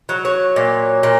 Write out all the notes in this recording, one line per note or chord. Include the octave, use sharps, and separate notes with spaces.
F#3
C#5
A#2
A#2